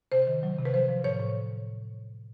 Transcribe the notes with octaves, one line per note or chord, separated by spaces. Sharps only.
C3 C5
D#3
F#3
C3
B4
F3 C5
F3
A2 C#5
A2